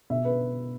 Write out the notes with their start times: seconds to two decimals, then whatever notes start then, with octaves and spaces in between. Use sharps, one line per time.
0.10 B2 E5
0.25 B4